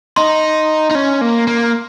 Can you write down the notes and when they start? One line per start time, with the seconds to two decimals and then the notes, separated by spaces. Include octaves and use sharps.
0.17 D#4 C6
0.91 D#4
0.95 C#4
1.21 A#3
1.48 A#3